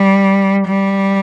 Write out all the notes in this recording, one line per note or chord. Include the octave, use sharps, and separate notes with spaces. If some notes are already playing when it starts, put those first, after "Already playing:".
Already playing: G3
G3